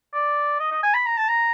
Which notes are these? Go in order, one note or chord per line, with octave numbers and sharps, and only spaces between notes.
D5
D#5
D#5
G#5
B5
A#5
A5
A#5